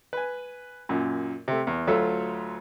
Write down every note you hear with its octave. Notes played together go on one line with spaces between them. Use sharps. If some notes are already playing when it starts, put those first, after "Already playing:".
B4 G#5
F#2 A#2
C3 A3
E2
D2 F#3 A3 F4 A4 E5